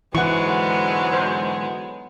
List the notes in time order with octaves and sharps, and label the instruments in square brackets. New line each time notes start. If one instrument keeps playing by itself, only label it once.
[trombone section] G#2 D3 F#3 [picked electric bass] E3 [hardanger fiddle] G#3 B3 [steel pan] F#5 C#6
[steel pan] C5